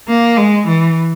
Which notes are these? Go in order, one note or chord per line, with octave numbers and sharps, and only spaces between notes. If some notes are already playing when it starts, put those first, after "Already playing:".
A#3
G#3
E3